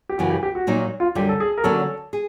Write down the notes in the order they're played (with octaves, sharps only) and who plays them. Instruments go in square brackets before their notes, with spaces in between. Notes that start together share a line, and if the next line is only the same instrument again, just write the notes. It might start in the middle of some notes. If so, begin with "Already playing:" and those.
[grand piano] G4
[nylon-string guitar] F#2 C#3 E3 [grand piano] F#4
[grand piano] G4
G4
F#4
[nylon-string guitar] A#2 F#3 A#3 D#4
[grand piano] F4
[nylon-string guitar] F#2 D3 G3 [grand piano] G4
[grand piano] A4
G#4
A#4
[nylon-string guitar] D3 F#3 A#3 C#4 F#4 [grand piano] A4
[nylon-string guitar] G#4